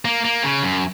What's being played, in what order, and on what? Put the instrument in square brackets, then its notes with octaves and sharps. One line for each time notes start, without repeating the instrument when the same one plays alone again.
[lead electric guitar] A#3
A#3
C#3
F#2